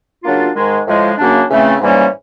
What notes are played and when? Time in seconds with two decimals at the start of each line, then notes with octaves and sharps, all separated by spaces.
0.23 C#3 F#3 A#3 D4 F4
0.55 G#2 D#3 G#3
0.86 A2 F3 G#3
1.18 F#2 C#3 F#3 A#3 D4
1.49 C#3 E3 A3 C4
1.80 G#2 E3 G3 A#3 C#4